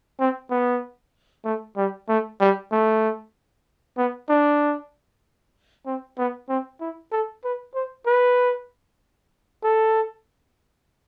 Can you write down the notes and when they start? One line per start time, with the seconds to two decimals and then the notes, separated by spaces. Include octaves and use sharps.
0.20 C4
0.51 B3
1.45 A3
1.77 G3
2.09 A3
2.40 G3
2.72 A3
3.98 B3
4.29 D4
5.86 C4
6.18 B3
6.49 C4
6.81 E4
7.12 A4
7.44 B4
7.75 C5
8.06 B4
9.64 A4